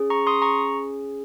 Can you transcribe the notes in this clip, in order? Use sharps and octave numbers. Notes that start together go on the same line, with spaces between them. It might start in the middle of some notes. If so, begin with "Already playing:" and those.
Already playing: C#4 G#4
A#5 C#6
C6 D#6
A#5 C#6